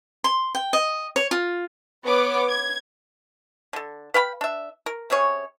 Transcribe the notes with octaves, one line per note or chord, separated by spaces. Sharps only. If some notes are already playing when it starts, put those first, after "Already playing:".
C6
G5
D#5
C#5
F4
B3 B4 C#5 D6
G#6
D3 A4
B4 F5 G5 B5
D4 E5
A#4
C3 C#4 G#4 C#5